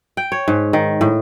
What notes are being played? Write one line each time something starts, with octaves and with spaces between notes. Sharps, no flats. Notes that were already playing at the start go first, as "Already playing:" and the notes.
G5
C#5
G#2
D#3
A2